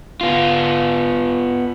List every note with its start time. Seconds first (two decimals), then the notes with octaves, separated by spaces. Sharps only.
0.21 B3 F4